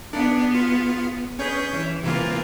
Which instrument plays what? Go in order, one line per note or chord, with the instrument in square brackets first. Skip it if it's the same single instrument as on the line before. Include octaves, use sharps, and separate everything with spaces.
[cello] B3 G#4 [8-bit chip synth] D4
[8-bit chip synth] F4
[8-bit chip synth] C#4 C#5 G6 [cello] G#4 B4
[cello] E3
[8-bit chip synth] C3 E3 A#3 [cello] F4